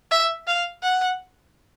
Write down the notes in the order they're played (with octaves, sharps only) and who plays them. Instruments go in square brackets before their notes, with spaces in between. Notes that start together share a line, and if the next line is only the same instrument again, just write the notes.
[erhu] E5
F5
F#5